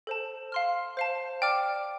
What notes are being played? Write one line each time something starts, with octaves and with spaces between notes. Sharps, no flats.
A4 C5 A5
F5 C6 F6
C5 F5 A5
D5 G5 D6 F6